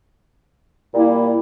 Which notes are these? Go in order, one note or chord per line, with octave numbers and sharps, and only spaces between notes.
A#2 G3 A#3 E4